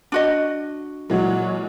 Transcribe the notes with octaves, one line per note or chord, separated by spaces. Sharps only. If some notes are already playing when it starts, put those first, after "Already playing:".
D4 F#4 D#5
A#2 E3 F#3 G#3